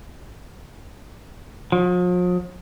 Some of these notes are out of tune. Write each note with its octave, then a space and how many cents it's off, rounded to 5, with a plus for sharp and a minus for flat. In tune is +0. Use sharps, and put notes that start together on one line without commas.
F3 +45